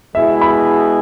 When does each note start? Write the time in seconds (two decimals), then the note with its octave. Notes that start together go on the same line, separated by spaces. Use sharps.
0.15 B2 G#3 E4 G#4 E5
0.41 B5